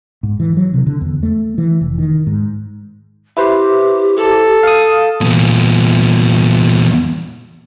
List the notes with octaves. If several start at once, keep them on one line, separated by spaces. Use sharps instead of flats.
G#2
E3
F#3
C3
D3
E2
A3
E3
F1
D#3
G#2
E4 G4 B4 C5
A4
F5 D#6
E2 A#2